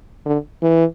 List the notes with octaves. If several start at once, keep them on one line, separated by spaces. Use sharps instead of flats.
D3
E3